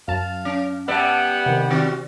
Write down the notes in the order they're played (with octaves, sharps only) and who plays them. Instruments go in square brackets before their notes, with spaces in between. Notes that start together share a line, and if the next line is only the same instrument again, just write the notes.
[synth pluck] F#2 A5 [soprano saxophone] F5
[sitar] C#4
[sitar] G3 D5 [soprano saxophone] B3 [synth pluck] E5 A5 [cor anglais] F#5
[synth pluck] C3 D#3
[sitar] D#3 C4 F#4 [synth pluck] D5